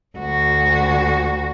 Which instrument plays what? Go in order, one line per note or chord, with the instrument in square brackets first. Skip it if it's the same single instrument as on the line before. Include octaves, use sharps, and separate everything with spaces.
[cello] D2 F#4